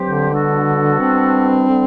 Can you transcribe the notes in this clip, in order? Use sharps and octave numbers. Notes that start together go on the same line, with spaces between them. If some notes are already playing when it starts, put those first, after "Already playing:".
Already playing: G2 F#3 C4 G4 C5
D3
B2 G3 D4 F#4 A4
C4
D3 G3 D4